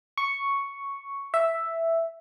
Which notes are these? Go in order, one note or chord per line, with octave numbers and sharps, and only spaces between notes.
C#6
E5